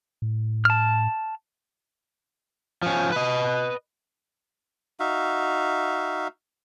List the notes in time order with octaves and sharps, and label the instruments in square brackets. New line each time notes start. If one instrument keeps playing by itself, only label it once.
[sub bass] A2
[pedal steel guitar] A5 F6
[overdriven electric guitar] F3 C#4
B4 D#5
[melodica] D#4 F#4 E5 F5